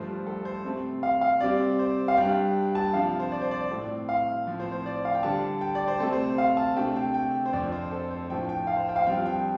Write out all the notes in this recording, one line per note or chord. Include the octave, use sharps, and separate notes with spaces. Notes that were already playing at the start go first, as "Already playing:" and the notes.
Already playing: G2 F3 A3 C5
A4
C5
C3 A3 C4
F5
F5
C3 G3 C4 D5
C5
F5
G2 G3 D4 G5
A5
C3 F3 D4 F5
C5
D5
C5
D5
A2 A3 C4
F5
A2 F3 C4
C5
C5
D5
F5
G5
D3 G3 D4 A5
G5
D5
C5
C3 A3 C4 A4
C5
F5
A5
C3 A3 D4 G5
G5
G5
C5
F2 F3 D4 D5
C5
A4
C5
A2 F3 A3 D4 G5
G5
F5
C5
G5
F5
G2 F3 C4 G5
G5